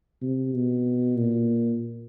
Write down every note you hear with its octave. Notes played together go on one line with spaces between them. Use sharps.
C3
B2
A#2